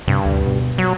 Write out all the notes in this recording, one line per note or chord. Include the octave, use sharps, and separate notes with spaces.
G2 C3
D2
B2
F#3